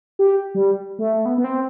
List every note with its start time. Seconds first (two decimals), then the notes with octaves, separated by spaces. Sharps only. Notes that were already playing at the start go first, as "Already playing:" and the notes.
0.19 G4
0.55 G3
0.99 A3
1.26 B3
1.38 B3
1.44 C4